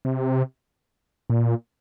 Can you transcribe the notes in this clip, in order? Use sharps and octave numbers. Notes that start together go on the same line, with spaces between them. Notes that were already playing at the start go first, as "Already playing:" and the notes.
C3
A#2